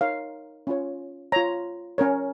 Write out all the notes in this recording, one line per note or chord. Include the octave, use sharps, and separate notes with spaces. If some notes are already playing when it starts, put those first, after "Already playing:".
D#4 A#4 C#5 F5
C#4 F4 C#5
F4 C#5 A#5
C#4 A#4 C#5